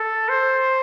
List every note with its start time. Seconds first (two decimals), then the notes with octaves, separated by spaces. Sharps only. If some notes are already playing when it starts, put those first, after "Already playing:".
Already playing: A4
0.29 C5